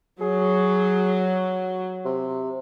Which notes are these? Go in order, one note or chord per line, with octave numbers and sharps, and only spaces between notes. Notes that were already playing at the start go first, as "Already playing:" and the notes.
F#3 G#4
C3